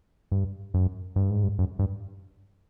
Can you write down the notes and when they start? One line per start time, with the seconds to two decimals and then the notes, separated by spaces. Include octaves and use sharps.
0.32 G2
0.74 F#2
1.16 G2
1.30 G#2
1.43 G2
1.59 F#2
1.79 G2